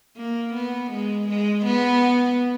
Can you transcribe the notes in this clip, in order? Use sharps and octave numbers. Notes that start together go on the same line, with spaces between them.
A#3
B3
G#3
G#3
B3